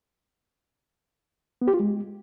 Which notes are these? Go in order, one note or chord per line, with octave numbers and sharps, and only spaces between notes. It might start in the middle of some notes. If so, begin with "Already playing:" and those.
B3
G4
F4
G#3